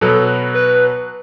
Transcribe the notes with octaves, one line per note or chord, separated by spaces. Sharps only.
B2 F#3 B3 A4
B4